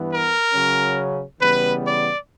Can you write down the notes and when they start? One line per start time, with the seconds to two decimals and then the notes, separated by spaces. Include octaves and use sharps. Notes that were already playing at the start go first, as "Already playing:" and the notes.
Already playing: G2 E3 B3
0.09 A#4
0.52 C#3 F#3 C#4
1.40 C#3 E3 G3 B3 B4
1.85 D5